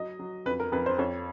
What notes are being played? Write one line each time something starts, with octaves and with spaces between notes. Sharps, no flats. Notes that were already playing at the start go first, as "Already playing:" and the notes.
Already playing: F#3 D#5
F#3
F2 B4
A#4
F2 B4
C5
F2 C#5